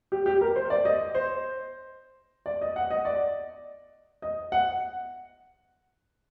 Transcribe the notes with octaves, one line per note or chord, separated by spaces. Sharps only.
G4
G4
A#4
C5
D5
D#5
C5
D5
D#5
F#5
D#5
D5
D#5
F#5